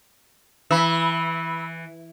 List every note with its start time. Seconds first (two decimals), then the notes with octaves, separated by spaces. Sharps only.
0.71 E3 B5 E6